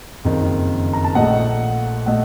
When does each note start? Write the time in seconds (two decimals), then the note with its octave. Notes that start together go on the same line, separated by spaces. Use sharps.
0.25 F#1 F2 D#3
0.93 A#5
1.04 A5
1.15 A#1 A#2 A3 D#5 F#5
2.06 A#2 A3 D#5 F#5